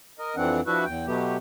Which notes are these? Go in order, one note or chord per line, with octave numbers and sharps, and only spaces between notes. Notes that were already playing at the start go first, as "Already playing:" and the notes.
A#4 D#5
F2 E3 C4 D4 F#5
F3 D4 E4 F#4 B4 E5
E2 G5
B2 F#3 A3 B3 G4